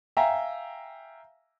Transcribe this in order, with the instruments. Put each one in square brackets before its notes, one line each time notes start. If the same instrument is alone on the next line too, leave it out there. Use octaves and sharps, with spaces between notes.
[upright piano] E5 F5 G5 G#5 A#5